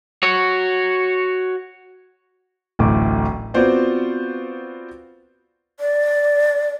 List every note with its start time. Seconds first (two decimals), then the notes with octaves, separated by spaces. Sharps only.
0.23 F#4 C#5
2.79 D1 A1 A3 D6
3.54 B3 C4 F4 F#4 C5 D5
5.80 D5